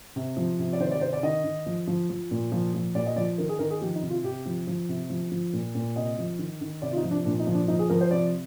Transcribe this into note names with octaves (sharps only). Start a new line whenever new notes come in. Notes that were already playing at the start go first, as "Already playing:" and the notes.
C3
F3
C3
D5
D#3 C5
D5
C3 C5
D5
D#3 D#5
D#3
F3
F3
F3
A#2
F3
F3
A#2 D5
D#5
F3 D5
D#3 A#4
G#4
D#3 A#4
G#4
F3 G4
D#4
C3
F4
C3 G4
F3
F3
C3
F3
F3
A#2
A#2
C3 D#5
F3
D#3
D#3
C3 D5
F4
D#4
F3
D4
A#2 D4
D#4
F3
D4
F3 D#4
G#4
F3 A#4
C5
C3 D5